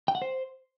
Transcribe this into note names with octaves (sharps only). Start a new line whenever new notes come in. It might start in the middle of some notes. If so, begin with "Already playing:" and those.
G5
F#5
C5